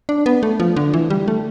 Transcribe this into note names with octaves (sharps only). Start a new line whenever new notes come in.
D4
B3
A3
F3
D3
E3
G3
A3